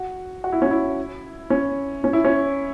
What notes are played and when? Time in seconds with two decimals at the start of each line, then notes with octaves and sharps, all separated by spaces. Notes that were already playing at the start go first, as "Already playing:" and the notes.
Already playing: F#4
0.44 F#4
0.52 E4
0.62 C#4
0.71 E4
1.50 C#4
2.04 C#4
2.13 E4
2.24 C#4